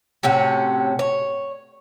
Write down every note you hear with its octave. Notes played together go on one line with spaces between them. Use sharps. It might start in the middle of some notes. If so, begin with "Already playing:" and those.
A2 C3 C#4 F#4
C#5